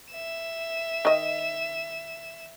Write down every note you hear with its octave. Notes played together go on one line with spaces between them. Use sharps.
E5 E7
D#3 D#5